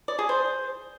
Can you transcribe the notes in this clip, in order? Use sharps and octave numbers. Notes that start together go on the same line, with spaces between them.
D5
G#4
C5